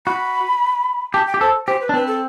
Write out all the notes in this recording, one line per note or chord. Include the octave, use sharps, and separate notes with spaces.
F#4 B5
G4 A5
G5
G4
A4 C5
G4 C5
B4
D4
C4 B4
A4